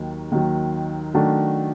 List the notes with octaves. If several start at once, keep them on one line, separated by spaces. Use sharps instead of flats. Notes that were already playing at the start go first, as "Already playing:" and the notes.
Already playing: D#2 D#3 F#3
D#2 D#3 F#3
D#3 F#3 A3 D4 F#4